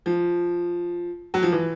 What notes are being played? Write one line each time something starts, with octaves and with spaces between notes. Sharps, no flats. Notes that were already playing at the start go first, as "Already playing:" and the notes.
F3
F#3
F3
E3